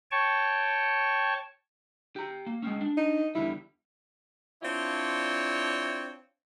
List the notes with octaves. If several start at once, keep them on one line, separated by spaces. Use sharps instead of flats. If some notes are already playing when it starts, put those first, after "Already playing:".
C#5 G5 A5 C#6
G4 A#5
A#3
G#3 C4 C#4
D4
D#4
E2 D3 G3 E4
C4 D4 E4 F4 C#5